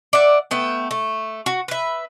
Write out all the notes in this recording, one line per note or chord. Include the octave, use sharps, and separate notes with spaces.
D5 E5 F#5
A3 B3 G5
A3
F#4
B4 E5